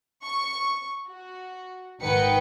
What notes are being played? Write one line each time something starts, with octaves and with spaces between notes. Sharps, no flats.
C#6
F#4
G#1 D#3 B4 F#5 G5 C#7